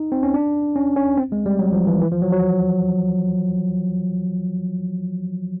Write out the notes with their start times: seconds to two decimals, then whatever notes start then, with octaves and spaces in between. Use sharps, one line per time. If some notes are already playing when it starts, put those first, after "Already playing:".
Already playing: D#4
0.12 C4
0.23 C#4
0.34 D4
0.76 C#4
0.96 C#4
1.17 C4
1.32 G#3
1.46 G3
1.59 F#3
1.73 F3
1.87 E3
2.02 E3
2.11 F3
2.22 F#3
2.32 F#3